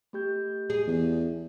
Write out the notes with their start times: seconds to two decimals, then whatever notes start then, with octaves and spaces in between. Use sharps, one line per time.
0.13 A3 G4 G6
0.70 G#4
0.87 E2